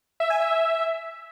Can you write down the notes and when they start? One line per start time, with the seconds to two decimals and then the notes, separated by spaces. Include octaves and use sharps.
0.20 E5
0.30 G#5
0.40 E5